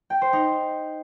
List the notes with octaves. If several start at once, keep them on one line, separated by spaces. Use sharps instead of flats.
G5
C5
D#4